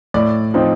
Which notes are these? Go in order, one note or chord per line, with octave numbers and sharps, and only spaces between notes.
A2 D5
F3 C4 D#4